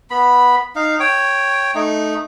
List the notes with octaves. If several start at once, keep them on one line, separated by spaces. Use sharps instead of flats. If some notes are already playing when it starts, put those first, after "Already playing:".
B3 B5
D#4 F5
C#5 G5
A3 D#4